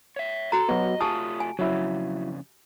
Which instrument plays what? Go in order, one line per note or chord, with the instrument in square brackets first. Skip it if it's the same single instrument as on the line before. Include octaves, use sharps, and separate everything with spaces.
[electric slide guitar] C#5 E5
[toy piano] F#4 A#5 [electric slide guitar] A4
[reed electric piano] F#3 B3 [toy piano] G4 [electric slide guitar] D#5
[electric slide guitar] A3 F4 [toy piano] G4 G#5 A5 [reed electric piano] D#6
[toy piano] G#5
[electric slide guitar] F2 C#3 [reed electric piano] F#3 E4